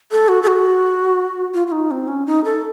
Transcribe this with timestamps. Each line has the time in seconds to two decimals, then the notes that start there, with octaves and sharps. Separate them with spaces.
0.12 A4
0.28 F#4
0.43 A4
0.47 F#4
1.54 F4
1.67 F4
1.72 D#4
1.91 C4
2.08 C#4
2.26 D#4
2.44 A4